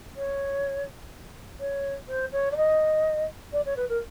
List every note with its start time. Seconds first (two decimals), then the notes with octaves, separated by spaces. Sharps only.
0.16 C#5
1.60 C#5
2.08 C5
2.32 C#5
2.52 D5
2.57 D#5
3.53 D5
3.66 C#5
3.77 B4
3.89 A#4